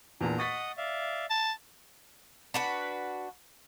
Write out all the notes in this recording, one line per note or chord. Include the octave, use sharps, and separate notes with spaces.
E2 A#2 D4 A#5
D#5 F#5 C#6 D#6 A6 B6
D5 E5 F5
A5
D4 F#4 B4